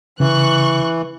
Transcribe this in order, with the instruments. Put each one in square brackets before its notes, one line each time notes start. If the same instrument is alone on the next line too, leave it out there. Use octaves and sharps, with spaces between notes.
[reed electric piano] C#3 [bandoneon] E3 [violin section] C#6 F#6